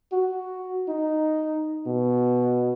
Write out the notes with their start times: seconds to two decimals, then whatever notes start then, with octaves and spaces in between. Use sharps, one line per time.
0.12 F#4
0.89 D#4
1.87 B2